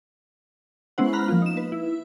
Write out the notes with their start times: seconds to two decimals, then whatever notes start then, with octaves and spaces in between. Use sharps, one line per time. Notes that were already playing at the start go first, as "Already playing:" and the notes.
0.98 G#3 B3 C#4 E4 C5 F#5
1.13 A#5 B5 F6 F#6
1.28 F3 A#3 F4
1.42 D#4 E7
1.57 B4
1.72 E4